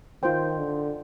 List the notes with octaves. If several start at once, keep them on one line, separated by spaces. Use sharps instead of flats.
D#3 F4 C5 G5
D3